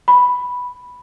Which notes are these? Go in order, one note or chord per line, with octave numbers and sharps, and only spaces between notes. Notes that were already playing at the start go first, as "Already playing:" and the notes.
B5